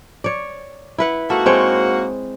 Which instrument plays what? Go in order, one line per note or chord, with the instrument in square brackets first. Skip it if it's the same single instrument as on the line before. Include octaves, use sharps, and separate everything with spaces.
[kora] C#5 D5
E4 B4 F#5
[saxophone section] G#2 A#3 F#4 [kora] A4
[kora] G#3 C4 C#5